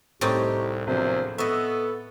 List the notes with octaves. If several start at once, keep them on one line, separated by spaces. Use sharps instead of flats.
C2 A2 C4 D#4 G4 A#5 C#6
A#1 E2 C3 F#3 C5
B3 A4 D#5 E5 C#6